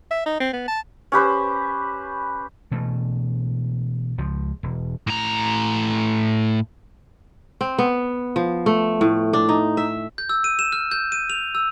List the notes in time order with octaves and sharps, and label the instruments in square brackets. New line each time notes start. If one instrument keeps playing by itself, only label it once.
[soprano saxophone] E5
D#4
C4
B3
A5
[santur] C#4 G4 B4 C5
[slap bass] B2 E3 A3
C#2 F3
E1
[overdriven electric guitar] A2 A#5
[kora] C4
B3
F3
A3
A2
D4
D#4
E5
[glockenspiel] G6
E6
D#7
E7
F6
G6
D#7
F7
E6